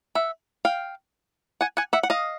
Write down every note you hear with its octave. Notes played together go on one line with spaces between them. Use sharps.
E5 F#5
F5 G5
F#5 G#5
F#5 G#5
E5 F#5
F#5
D#5 F5